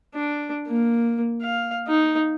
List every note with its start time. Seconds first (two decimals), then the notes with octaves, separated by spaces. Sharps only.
0.14 D4
0.67 A#3
1.41 F5
1.87 D#4